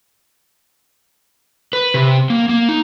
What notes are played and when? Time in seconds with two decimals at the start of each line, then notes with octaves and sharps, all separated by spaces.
1.73 B4
1.94 C3
2.30 A#3
2.49 A#3
2.68 D#4